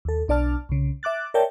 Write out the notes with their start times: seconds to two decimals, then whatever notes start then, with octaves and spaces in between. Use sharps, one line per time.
0.05 D#2 A4
0.28 B1 D4 D5 A5 F6
0.69 C2 C#3
1.03 E5 D6 F#6 A6
1.34 A#4 C#5 D5 E5 G5 A5